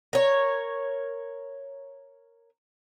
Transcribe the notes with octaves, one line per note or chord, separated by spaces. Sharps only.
A#4 C#5